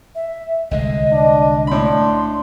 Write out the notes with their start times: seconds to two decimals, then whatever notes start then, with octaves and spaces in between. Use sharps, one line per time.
0.15 E5
0.71 C2 D3 G#3 D#5
1.13 D4
1.67 A2 D4 B5 C6